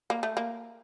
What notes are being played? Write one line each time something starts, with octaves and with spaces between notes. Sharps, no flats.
A#3
A3
A#3